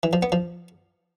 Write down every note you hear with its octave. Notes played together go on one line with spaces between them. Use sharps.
E3
F3
B3
F3